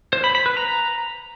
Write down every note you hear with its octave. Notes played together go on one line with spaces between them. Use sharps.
C5
B5
B5
B4
A#5